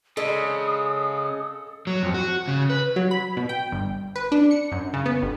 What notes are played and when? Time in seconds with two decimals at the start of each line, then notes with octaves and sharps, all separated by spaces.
0.17 C#3 G#3 A4 D#6
1.87 F#3
2.03 F2
2.14 F#4
2.48 C#3
2.70 B4
2.96 F#3
3.11 B5
3.37 B2
3.49 G5
3.72 G1
4.16 B4
4.32 D4
4.51 C#7
4.72 F#2
4.94 C#3
5.06 B3
5.22 G1